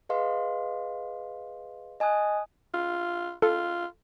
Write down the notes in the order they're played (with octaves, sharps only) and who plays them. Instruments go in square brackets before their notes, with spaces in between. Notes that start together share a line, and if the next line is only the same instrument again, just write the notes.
[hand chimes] G#4 B4 D#5 F5 C6
D#5 G#5 A5 D#6 F#6
[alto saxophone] F4
[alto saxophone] F4 [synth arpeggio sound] A4